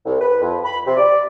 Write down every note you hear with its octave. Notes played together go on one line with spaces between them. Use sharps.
C2
B4
F2
B5
C3
D5